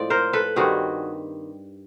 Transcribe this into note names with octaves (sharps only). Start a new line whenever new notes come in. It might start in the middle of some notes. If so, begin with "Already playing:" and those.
Already playing: A2 F3 G#3 C4 D5
A#4 C5
A4 B4
G2 D#3 G3 C4 F#4 G#4